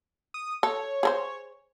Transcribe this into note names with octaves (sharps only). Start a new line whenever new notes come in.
D#6
A4 C#5
G#4 A4 C5